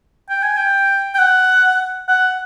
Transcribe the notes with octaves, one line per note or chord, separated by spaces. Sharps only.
G5
G#5
G5
G5
F#5
F#5